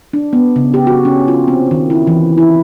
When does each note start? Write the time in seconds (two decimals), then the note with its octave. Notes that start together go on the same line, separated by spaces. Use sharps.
0.13 D4
0.33 B3
0.56 C#3
0.74 G4
0.87 F#4
1.05 C#4
1.28 F4
1.48 C4
1.71 D#3
1.90 E4
2.07 E3
2.38 E4